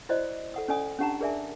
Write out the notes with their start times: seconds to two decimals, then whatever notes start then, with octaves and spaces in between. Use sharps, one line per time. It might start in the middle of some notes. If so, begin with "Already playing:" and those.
0.09 E4 F#4 C5 D5 D#5
0.54 A4 F#5 D#6
0.68 C#4 A4 D5 G#5 D#6
0.99 C#4 D4 G4 F#5 A5 A#5
1.21 G#4 A#4 D5 E5 G#5